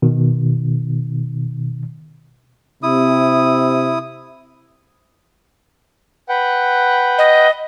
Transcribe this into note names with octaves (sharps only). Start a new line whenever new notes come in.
B2 D#3
C3 E4 D#6
B4 F#5 G5
D#5